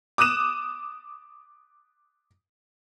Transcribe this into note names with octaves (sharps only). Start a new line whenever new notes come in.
D6 D#6 F#6 D#7 E7